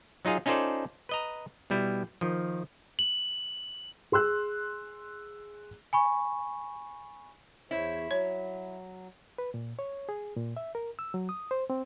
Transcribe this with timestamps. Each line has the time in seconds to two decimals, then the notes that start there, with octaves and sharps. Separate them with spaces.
0.25 F#3 D#4 F4 G#4 F5
0.46 C#4 D#4 F4 A4 C5 D5
1.09 B4 D#5 A#5
1.70 B2 G3 E4
2.21 D#3 F3
2.99 F#7
4.12 G#4 C6 E6 F#6
5.93 G#5 B5 C#6
7.71 E2 E4 C5 C#5
8.11 F#3 C#5
9.38 B4
9.54 A#2
9.79 C#5
10.09 G#4
10.36 A#2
10.57 E5
10.75 A#4
10.99 E6
11.14 F#3
11.29 D#6
11.51 C5
11.70 C4